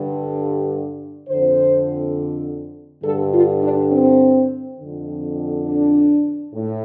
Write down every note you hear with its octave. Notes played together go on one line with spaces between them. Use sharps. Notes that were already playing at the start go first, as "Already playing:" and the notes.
Already playing: G2 D3
F2 D3 C5
G2 D3 A4
F4
D4
C4
F2 D3
D4
A2